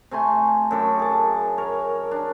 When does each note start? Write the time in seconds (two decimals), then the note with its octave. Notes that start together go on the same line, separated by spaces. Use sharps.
0.11 C3 A3 G#5 C6
0.71 F#2 A4 D6
0.99 G#4 A5
1.58 A#4 C#5
2.11 D4